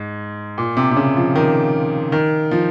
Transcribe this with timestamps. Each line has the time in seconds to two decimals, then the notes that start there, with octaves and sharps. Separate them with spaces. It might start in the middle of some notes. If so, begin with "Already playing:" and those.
Already playing: G#2
0.58 A#2
0.77 C3
0.91 C3
0.97 C#3
1.16 F3
1.36 D#3
2.12 D#3
2.51 F3